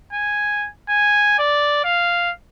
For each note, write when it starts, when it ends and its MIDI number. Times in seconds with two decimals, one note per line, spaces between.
0.13 0.68 80
0.89 1.37 80
1.39 1.82 74
1.84 2.31 77